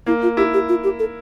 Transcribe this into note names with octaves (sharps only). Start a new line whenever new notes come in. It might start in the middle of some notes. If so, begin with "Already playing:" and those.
A#3 E4
F4
E4 G4
G4
F4
G4
A4